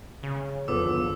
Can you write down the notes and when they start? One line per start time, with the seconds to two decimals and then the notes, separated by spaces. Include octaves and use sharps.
0.23 C#3
0.68 G1 E2 F3 B3 F4 A4 D6 E6